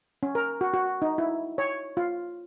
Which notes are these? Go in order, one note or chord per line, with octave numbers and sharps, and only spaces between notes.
C#4
A#4
F#4
F#4
D#4
E4
C#5
F4